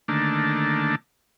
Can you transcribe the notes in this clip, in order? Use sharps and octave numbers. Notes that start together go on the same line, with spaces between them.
D3 D#3 A3 A#3 D4